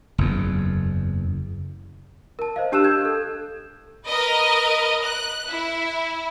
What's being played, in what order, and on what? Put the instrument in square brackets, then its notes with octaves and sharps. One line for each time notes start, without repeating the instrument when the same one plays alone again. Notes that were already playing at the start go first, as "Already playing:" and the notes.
[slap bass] F#1 E2
[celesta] A#4 A5
C5 D#5 F5
D4 G4 A5 E6 F#6 E7
G6 G#6
A4
[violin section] A#4 B4 D#5
F#6
E4